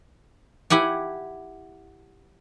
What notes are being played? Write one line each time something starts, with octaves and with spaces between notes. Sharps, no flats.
E4 G4 F#5 G#5